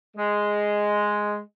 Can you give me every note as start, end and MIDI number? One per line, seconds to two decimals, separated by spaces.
0.16 1.40 56